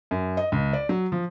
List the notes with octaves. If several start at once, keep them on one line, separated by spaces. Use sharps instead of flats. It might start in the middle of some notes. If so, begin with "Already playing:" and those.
F#2
D#5
C#2
D5
F#3
F3